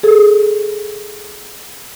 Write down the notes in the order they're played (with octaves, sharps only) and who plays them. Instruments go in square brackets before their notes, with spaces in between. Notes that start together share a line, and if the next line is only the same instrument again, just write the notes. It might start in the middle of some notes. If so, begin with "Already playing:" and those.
[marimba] G#4 A4